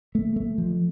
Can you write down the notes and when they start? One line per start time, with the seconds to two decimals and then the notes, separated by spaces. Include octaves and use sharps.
0.15 A3
0.36 A3
0.58 F3